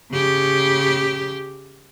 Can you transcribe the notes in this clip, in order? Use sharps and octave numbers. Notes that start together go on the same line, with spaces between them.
C#3 G4